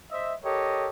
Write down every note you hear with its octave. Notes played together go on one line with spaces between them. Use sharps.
C5 D#5 E5
G4 A4 A#4 C#5 D#5